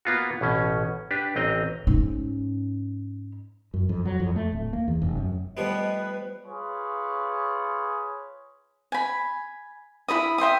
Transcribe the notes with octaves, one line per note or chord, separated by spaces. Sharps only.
A#3 B3 F4 F#4
A1 B2 C#4
D4 G4 B4
A1 C4 D#5 A#5
G#2 C#4
F#2
F2
F#3
F2
A3
D1
A#3
E2
F1
F#2
F3 G3 A3 B3 B4 D#5
F4 G#4 B4 C#5
G#5 B5
E4 A4 B5 D#6
E5 G5 C6 D#6